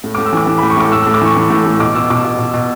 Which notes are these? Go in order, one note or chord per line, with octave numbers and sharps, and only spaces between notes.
A2
A2 D6
E6
E3 D6
E3
A2 B5
C#6
A2 D6
A2 E6
A2 E6
D6
E3 C#6
E3
A2
A2
B2 D6
B2 E6
B2 D6
B2
B2
B2